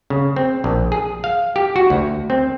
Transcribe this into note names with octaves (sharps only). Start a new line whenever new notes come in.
C#3
C4
A#1
G#4
F5
G4
F#4
D2
C4